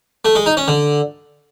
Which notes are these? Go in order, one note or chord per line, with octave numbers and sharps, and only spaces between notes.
A3
G#3
D#4
C#4
D3